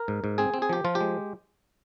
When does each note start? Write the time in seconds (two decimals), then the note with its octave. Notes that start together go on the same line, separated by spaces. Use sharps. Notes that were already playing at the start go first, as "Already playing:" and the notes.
Already playing: A#4
0.08 G#2
0.24 G#2
0.38 C4 G#4
0.54 C4
0.62 G#4
0.69 F3 G4
0.85 F3 F4
0.95 G4
1.00 G#3